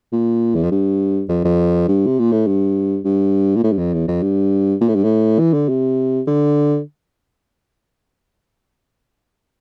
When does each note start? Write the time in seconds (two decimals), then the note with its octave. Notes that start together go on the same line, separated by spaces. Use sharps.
0.12 A#2
0.55 E2
0.63 F2
0.71 G2
1.29 F2
1.45 F2
1.88 G2
2.06 C3
2.19 A#2
2.32 A2
2.47 G2
3.05 G2
3.56 A#2
3.64 A2
3.72 G2
3.78 F2
3.94 E2
4.08 F2
4.23 G2
4.81 A#2
4.89 A2
4.95 G2
5.04 A2
5.39 E3
5.54 D3
5.69 C3
6.27 D3